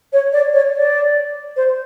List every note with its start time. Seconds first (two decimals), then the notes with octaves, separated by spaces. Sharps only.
0.13 C#5
0.32 D5
0.53 C#5
0.74 D5
1.56 C5